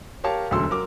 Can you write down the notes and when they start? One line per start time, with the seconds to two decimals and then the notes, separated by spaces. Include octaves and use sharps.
0.24 G4 A#4 C#5 F5 A5
0.51 E1 D2 F#3 A4 C6 E6
0.70 F#3 A#4 D6